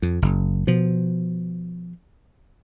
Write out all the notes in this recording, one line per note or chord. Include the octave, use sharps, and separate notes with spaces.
F2
F#1
B2 F3